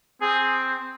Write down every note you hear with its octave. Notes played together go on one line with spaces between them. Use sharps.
C4 G#4